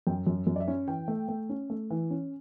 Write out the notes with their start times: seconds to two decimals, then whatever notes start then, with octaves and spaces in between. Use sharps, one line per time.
0.07 F#2 G5
0.27 F#2
0.47 F#2
0.56 D5
0.60 E5
0.68 C#4
0.88 E3 G5
1.08 A3
1.28 A3
1.49 C#4
1.70 A3
1.90 E3
2.10 C#4